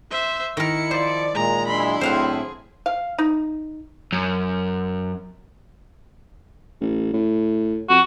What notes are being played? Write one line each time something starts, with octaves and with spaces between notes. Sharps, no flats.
C5 E5
D#3 E4 A#4 C#7
F3 C5 D5
A#2 G#3 A#5
F#3 D4 E4 B5 C6
A2 C4 G#4 C5 F5 F#5
F5
D#4
F#2
A1
A2
F2 F#4